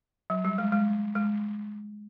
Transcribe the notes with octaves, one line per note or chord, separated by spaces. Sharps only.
F#3
G3
G#3
G#3
G#3